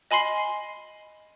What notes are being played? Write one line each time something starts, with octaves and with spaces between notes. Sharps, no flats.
D#5 G#5 B5 C6 C7